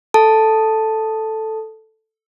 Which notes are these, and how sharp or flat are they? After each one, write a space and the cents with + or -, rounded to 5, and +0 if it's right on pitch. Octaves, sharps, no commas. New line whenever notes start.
A4 +0 A5 +0